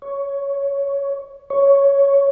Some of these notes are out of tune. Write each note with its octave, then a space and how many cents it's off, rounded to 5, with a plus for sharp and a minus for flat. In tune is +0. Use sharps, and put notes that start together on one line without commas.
C#5 +10
C#5 +5